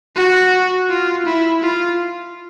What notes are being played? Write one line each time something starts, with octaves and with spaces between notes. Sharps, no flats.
F#4
F4
E4
F4